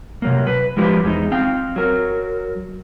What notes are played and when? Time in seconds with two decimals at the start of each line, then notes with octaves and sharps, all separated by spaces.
0.22 C3 F#3 A#3
0.47 B4
0.77 F3 G#3 E4 G4 B4 C5
1.03 E2 G#3 D#4
1.32 C4 F5 G5
1.76 F#3 A#4